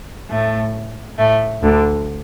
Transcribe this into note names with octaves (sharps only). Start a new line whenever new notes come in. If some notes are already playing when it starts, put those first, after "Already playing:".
A2 A3
A2 A3
D2 D3